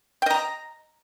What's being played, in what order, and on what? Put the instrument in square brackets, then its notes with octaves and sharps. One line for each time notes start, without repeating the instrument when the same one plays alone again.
[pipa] G5
D#5
A#5